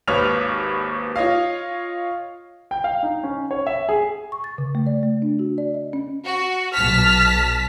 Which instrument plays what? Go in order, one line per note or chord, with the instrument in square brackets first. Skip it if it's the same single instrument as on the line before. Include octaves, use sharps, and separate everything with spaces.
[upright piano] G#1 D#2 B4 C#5 F6 F7
F4 C#5 D#5 F5
[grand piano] G5
F5
D#4
C#4
C#5
E5
G#4
[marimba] C#6
A6
C#3
A3
D5
A3
D4
F#4
D5
D#5
C#4
[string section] F#4
[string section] B1 A5 B6 [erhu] F6